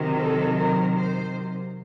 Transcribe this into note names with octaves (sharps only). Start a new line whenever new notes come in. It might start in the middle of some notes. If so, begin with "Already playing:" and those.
Already playing: C3 D#3 F#3
A4
A#4
C5